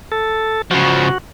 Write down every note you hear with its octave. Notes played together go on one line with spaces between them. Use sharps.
A4
C#3 F3 F#4